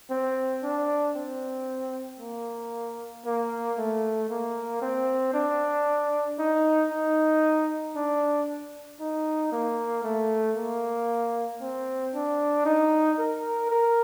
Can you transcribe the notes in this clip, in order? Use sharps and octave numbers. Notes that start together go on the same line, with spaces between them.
C4
D4
C4
A#3
A#3
A3
A#3
C4
D4
D#4
D#4
D4
D#4
A#3
A3
A#3
C4
D4
D#4
A#4
A#4